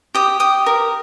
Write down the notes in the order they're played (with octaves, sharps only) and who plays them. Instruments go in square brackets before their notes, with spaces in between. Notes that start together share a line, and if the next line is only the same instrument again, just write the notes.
[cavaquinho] G4 D#6
G4 D#6
A#4